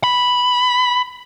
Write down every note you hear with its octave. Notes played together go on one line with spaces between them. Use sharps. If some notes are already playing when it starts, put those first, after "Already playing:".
B5